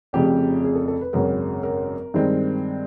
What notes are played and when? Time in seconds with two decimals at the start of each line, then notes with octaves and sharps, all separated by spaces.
0.13 F1 F2 C#3 G4
0.64 G#4
0.75 A4
0.88 A4
1.01 B4
1.13 G#1 F#2 C#3 A#4
1.63 A#4
2.14 G2 D#3 G#3 C4